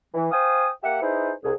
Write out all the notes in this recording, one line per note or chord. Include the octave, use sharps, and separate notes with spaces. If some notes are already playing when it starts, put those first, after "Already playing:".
E3
C5 F5 G5 G#5 D#6
A#3 G4 E5 F#5
D#4 E4 G#4 B4 C5
C2 G#4